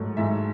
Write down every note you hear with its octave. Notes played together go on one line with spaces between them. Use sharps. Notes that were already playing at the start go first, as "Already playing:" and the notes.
Already playing: G#2 F#3 A3
G#2 E5